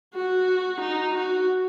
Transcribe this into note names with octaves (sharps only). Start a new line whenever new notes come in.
F#4
D#4
F#4